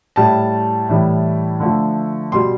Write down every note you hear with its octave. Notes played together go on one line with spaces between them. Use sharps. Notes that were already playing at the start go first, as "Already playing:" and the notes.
A2 G3 A5
A2 E3 G3
D3 F3 A3
B2 G3 C6